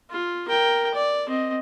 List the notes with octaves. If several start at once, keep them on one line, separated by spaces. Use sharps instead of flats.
F4
A#4 G5
D5
C4 D#5